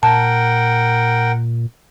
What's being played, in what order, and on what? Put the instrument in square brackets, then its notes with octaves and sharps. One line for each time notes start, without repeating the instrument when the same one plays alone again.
[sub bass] A#2 [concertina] A#4 F#5 G5 [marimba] A5